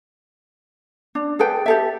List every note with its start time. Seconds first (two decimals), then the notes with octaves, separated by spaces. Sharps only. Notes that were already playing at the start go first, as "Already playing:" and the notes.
1.15 D4
1.39 G#4 A4 B4 G5
1.66 G4 A4 E5